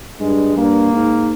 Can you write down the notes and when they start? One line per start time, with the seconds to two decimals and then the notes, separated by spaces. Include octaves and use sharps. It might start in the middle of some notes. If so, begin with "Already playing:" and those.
0.20 G2 G#3
0.56 G2 A#3
0.93 G#2